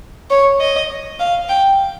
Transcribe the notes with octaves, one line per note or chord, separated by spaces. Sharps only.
C#5
D#5
F5
G5